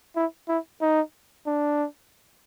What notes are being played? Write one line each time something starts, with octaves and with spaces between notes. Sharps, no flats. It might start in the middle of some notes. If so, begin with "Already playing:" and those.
E4
E4
D#4
D4